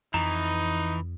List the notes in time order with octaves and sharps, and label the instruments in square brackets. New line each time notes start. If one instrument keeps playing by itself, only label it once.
[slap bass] F2 [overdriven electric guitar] E3 [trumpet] D#4 [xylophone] A#5